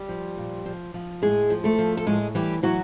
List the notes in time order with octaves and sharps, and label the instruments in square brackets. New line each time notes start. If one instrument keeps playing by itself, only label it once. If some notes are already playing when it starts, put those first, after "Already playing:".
Already playing: [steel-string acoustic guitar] G3 G4
F3
A#2
F3
F3
A2 G#3 G#4
F3
A3 A4
F3
A4
A2 G#3 G#4
E3 G3 G4
E3 F#3 F#4